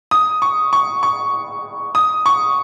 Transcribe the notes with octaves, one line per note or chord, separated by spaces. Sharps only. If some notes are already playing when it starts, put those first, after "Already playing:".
D#6
C#6
C#6
C#6
D#6
C#6